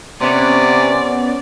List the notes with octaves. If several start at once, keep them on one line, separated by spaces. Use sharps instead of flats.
C3 B3 C#4 D5